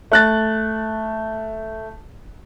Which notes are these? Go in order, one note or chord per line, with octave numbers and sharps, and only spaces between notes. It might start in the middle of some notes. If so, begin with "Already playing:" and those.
A3 F#6 A6